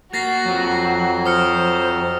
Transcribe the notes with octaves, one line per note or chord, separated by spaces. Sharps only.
A#3 F#4 A6 A#6 C7
F2 F3 F#3
C5 D#6 F6 C#7